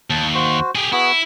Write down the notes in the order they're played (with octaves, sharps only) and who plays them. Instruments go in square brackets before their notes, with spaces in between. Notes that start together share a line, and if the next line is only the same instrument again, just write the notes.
[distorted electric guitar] D#2 [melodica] A5
[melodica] F#4 C5
[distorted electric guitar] G4 G#4
[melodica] B3 F#4 G#4 [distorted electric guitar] E4